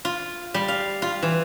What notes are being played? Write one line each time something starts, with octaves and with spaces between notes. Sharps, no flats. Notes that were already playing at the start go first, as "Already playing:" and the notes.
F4
G3
F5
F4
E3